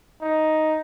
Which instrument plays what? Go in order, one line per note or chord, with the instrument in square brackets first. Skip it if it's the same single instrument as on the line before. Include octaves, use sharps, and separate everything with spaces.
[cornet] D#4